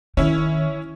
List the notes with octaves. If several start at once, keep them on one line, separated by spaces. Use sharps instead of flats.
D#3 C#4 E4